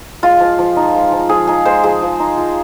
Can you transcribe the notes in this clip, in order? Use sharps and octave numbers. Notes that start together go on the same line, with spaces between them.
G#3 F4
F3
F3
D#4
G#3
F3
F3 G#4
D#4 G#4
G#3 C5
F3 G#4
F3
D#4
F4